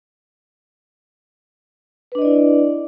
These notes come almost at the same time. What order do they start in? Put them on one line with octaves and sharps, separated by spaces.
B4 D4 D#5 D5 E4